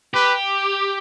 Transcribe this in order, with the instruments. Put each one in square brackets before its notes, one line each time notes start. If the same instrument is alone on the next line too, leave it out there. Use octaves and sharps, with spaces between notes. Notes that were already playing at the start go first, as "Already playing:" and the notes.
[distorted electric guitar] G4 [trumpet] B4